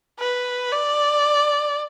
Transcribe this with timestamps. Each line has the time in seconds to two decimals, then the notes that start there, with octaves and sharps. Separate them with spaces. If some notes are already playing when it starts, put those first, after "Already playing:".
0.19 B4
0.72 D5